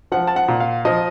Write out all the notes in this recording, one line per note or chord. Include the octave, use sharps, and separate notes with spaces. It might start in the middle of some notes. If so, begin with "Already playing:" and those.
F3 F#5
A5
F#5
A#2
F5
F3 D#5